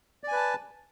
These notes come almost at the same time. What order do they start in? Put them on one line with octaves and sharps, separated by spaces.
D5 G#5 B4 A5